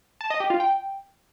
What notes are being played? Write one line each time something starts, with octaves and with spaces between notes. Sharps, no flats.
A5
D#5
G4
F4
G5